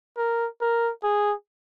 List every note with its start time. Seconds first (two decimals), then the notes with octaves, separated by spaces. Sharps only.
0.17 A#4
0.61 A#4
1.03 G#4